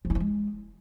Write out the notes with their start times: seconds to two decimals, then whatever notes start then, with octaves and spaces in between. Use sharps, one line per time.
0.05 F3
0.10 E4
0.15 F3
0.20 G#3